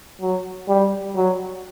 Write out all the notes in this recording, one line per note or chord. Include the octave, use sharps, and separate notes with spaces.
F#3
G3
F#3